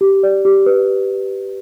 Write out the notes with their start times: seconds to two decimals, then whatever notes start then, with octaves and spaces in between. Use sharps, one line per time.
0.01 G4
0.23 D5
0.45 G4
0.66 B4